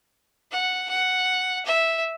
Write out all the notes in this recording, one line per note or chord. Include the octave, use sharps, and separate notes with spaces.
F#5
F#5
E5